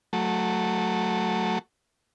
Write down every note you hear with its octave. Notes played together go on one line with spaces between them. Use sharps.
F#3 A3